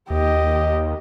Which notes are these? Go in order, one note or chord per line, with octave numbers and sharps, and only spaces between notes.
D#2 G4 D#5